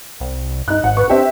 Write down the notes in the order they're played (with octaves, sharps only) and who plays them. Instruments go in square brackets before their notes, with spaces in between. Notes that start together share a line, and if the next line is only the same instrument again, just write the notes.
[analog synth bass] C2
[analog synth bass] G2 [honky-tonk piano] D#4 F#6
[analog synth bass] G#1 [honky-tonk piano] F#5
[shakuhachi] B4 [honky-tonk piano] C#6
[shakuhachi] C4 [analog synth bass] D4 [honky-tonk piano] G4 E5